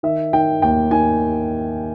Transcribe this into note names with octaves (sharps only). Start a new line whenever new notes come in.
D#3 E5
D#3 G5
D#2 G5
D#3 G#5